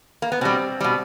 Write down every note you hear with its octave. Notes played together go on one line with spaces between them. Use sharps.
A#3
B3
B2 G3 C4
B2 G3